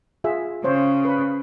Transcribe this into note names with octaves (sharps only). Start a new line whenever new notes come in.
F4 G#4 E5
C#3 C5 C#5
B4 B5